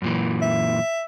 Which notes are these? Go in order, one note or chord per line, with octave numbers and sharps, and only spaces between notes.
F#2 A#2 E3
E5